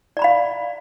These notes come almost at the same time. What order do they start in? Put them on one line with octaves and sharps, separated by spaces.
D5 A#5 B5 F5